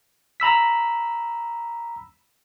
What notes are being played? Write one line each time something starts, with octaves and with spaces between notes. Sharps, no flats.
A#5 B5 E6 B6